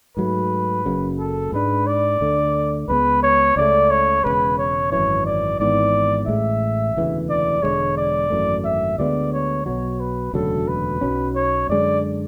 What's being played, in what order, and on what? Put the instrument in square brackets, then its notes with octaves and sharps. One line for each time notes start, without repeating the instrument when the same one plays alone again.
[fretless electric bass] G#2 F#3 A3 [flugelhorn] B4
[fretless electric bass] F#1 F#2 C#3
[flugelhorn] A4
[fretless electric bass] G#2 G#3 D4 [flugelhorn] B4
[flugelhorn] D5
[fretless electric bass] D2 D3 A3
[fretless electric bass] C#2 C#3 G#3 B3 [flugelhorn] B4
[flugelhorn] C#5
[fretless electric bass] C#2 C#3 E3 [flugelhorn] D5
[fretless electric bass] A3
[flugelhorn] C#5
[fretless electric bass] E1 E2 C#3 G#3 [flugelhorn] B4
[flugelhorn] C#5
[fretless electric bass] G#1 F#2 E3 [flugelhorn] C#5
[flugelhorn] D5
[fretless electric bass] G#1 G#2 E3 B3 [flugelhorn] D5
[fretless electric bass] A1 A2 G#3 [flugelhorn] E5
[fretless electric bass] E1 D2 C#3 E3
[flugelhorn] D5
[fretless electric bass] E1 D2 D3 G#3 [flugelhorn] C#5
[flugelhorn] D5
[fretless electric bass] G#1 F#2 E3 A3
[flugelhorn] E5
[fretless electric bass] D2 D3 G#3 B3 [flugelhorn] D5
[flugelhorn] C#5
[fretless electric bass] B1 B2 F#3 [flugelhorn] C#5
[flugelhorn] B4
[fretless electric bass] E1 D2 C#3 F#3 [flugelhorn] A4
[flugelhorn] B4
[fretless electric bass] B1 B2 F#3 C#4
[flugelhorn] C#5
[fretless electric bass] F#2 D3 G#3 D4 [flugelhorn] D5